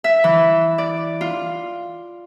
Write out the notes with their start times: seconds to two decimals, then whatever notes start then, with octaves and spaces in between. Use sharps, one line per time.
0.04 E5
0.24 E3
0.78 D5
1.21 F4